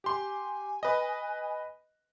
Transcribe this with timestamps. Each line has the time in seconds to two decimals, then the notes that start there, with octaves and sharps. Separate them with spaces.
0.04 G4 G#5 C6
0.83 B4 D#5